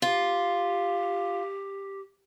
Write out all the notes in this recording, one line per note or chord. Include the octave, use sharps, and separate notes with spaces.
F4 G4